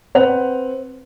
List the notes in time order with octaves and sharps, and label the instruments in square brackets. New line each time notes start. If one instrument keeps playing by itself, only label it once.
[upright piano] C4 B4 F#5 F7